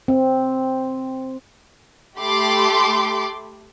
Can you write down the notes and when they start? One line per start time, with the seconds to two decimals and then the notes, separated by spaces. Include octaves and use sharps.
0.08 C4
2.18 A3 G4 B5 C6 D6